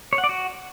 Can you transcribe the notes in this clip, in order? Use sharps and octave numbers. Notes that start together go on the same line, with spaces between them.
C#5
F#5
D5
F#4